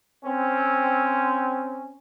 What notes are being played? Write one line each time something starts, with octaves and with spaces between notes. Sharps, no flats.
C4 C#4